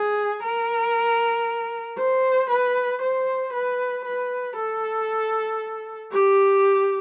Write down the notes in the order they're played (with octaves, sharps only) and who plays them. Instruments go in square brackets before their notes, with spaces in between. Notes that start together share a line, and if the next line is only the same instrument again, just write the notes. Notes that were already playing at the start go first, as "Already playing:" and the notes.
Already playing: [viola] G#4
A#4
C5
B4
C5
B4
B4
A4
G4